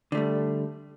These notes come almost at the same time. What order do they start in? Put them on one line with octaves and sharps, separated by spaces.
D3 A3 G3